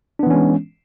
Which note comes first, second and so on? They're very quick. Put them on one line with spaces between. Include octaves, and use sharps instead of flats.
D4 B3 E3 C#4 G#3